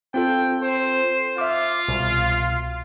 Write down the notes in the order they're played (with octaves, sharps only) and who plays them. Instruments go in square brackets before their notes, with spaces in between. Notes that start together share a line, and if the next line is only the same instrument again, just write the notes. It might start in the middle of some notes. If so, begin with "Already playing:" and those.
[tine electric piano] C4 F4 A4 [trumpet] G5
[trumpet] C5
[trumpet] F4 [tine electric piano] E5 D6
[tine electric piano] C2 B2